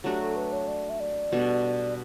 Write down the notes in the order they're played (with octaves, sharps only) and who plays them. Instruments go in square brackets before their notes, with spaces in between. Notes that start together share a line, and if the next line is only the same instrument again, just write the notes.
[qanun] F#3 A3 D4 F#4 [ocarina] G4
[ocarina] A4
B4
C#5
D5
E5
D5
[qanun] B2 G3 D4 A4